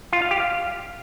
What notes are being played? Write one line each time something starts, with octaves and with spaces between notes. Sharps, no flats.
F4
F5
G4
F5